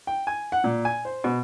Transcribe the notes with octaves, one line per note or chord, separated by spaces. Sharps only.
G5
G#5
F#5
A#2
G#5
C5
B2